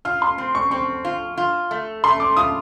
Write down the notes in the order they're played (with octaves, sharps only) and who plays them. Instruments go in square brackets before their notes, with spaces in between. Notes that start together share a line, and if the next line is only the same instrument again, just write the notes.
[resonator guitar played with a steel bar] F4 [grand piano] F6
[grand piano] C6
[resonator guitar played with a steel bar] C4
[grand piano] C#6
[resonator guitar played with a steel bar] C4 [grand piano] C#6
[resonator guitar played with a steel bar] F4
F4
A3
[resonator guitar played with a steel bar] A3 [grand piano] C6
[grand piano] D6
[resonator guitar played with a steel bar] F4 [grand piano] D#6